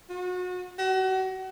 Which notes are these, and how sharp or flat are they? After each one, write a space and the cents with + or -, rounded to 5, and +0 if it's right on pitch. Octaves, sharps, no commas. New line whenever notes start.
F#4 -30
F#4 +35